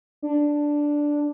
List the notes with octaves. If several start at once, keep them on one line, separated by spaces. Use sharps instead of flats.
D4